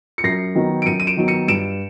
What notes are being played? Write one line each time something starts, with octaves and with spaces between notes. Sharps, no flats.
C#7
F#2 A#6 C7
D#3 F#3 B3
D7
F#2 C#7 D#7
D#7
D7 E7
D#3 F#3 B3
C#7 D#7
G2 D7 E7